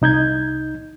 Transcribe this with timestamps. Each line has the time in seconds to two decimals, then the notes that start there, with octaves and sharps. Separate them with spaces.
0.02 C2 D#4 G6 G#6